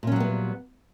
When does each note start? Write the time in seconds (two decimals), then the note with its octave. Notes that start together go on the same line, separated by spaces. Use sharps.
0.03 A#2
0.07 C#4
0.12 F#3
0.16 G3
0.20 B3